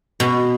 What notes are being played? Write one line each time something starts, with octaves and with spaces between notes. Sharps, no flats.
B2